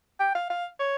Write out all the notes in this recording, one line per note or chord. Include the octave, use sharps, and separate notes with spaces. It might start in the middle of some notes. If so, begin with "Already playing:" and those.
G5
F5
F5
C#5